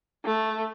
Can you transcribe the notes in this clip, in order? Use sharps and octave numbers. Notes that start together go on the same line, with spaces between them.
A3